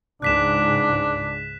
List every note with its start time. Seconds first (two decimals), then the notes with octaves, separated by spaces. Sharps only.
0.22 C#2 G#2 D4 F#6 B6 E7